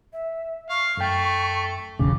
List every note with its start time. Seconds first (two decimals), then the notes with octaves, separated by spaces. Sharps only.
0.13 E5
0.70 F5 C#6
0.97 F#2 A3 G5
1.99 E1 A1 C#3 D6